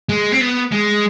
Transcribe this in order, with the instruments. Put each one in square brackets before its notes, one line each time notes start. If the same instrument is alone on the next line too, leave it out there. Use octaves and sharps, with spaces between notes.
[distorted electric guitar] G#3
C4
B3
G#3